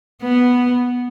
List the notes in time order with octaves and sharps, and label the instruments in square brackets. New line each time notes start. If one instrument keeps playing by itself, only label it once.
[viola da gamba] B3